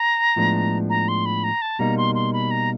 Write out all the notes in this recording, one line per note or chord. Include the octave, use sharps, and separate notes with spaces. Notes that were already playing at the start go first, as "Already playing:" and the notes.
Already playing: A#5
A2 F3 G#3 B3 D4
A#5
C6
B5
A#5
A5
B2 G3 A#3 D#4 A#5
C6
C6
B5
A#5